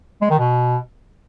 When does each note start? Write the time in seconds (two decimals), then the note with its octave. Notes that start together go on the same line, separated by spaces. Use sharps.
0.21 G#3
0.30 D#3
0.39 B2